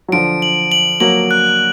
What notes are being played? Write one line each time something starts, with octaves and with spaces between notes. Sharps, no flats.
F#3
D3 F3 D7
F#7
F#7
F#3 A#3 F#7
F#6